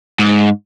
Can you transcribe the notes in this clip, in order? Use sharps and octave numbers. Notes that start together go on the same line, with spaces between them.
G#2